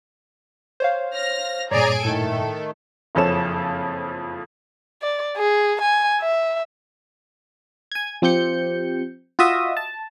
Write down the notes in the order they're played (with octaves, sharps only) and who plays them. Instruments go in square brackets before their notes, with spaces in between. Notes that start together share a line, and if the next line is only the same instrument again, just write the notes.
[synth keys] C5 C#5 F5
[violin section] F6 A#6
[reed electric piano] G2 A#2 [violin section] G#4 G#5 D7 [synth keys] C#5 [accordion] D5 A#5
[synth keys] A2 [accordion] D#3 A3 [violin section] A4
[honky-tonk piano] F#1 F2 F3 A4 C#5 E7
[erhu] D5
G#4
G#5
E5
[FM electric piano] G#5 G#6
F3 C4 G4 G6 C#7
F4 F#4 D#5 E5 D#6
A5